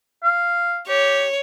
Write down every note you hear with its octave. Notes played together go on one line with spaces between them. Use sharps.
F5
G4 C#5